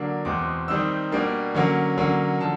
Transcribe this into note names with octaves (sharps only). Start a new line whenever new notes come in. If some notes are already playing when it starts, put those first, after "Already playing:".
Already playing: D3 F#3 A#3 D4
E2 B2 G#3 C4 D6
D#3 G3 C4 D#4 E6
B2 G3 A#3 D4
D3 F#3 A#3 C#4
D3 F#3 A#3 C#4
D3 F3 A5